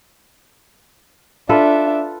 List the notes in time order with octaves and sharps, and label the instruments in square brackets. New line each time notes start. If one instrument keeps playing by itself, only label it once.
[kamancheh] D4 E5 [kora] F4 A4 B4